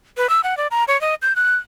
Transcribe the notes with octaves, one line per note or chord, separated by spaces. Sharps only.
B4
E6
F#5
D5
A#5
C#5
D#5
G6
F#6